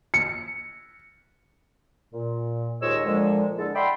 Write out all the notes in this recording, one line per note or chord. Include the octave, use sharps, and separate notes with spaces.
C#7
A#2
D#2 G#2 F4 C#5 D#5 E6
A#2 D3 F3 G#3
D3 G#3 E4 A4
D5 E5 F#5 G5 B5 C6